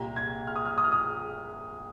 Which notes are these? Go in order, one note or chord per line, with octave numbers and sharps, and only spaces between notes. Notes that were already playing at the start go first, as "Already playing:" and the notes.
Already playing: C2 A#2 G3 A#5
G#6
F6
D#6
F6
D#6
F6
D#6